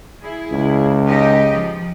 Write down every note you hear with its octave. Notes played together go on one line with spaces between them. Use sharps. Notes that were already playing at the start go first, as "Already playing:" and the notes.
E4 G#4
C#2
D#4 G4 D#5
F3